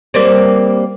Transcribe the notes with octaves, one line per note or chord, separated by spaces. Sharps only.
G3 A#3 C4